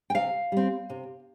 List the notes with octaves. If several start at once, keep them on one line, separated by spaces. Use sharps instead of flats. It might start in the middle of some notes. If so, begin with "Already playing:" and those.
G5
C3 F5
G3 C4
C3